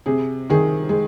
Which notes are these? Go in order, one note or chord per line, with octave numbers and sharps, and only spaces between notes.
C3 G#4
D#3 G#4
G#3